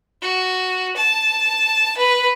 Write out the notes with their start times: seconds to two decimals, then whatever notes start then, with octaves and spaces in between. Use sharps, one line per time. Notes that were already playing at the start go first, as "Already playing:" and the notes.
0.22 F#4
0.96 A5
1.97 B4